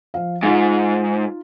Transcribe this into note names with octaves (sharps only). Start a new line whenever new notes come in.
F3 F5
G#2 D#4 F4